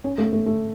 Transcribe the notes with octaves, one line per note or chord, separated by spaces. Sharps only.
C#4
A3
A3
A3